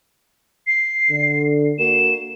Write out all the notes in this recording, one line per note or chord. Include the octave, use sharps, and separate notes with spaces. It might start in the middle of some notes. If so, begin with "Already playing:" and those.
C7
D3
A#3 F#4 A#4 E7